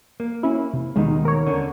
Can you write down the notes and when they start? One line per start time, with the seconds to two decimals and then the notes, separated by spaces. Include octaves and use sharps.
0.20 A#3
0.43 C#4 E4
0.73 C3
0.96 D#2 B2 D#3 G#3 D#4
1.25 A#4 C#5
1.47 D3 C#4